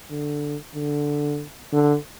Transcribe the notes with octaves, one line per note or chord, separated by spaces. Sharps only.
D3
D3
D3